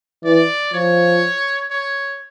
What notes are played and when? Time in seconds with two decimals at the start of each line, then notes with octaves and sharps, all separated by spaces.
0.24 E3 D5
0.73 F3 C#5
1.71 C#5